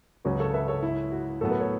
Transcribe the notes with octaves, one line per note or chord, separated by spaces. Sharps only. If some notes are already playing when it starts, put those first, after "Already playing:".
C#2 C#3 F#3 C#4 F#4 B4
A4 C#5
B4 E5
A4 C#5
E4
F#4
A2 F#3 B3 E4 A4
F#4 B4
A4 C#5